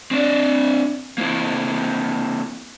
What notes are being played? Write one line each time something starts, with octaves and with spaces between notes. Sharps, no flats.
C4 D4 D5
A#3 C4 E4